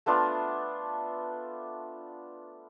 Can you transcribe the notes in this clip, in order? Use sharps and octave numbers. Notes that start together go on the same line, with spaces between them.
A3 B3 D4 F4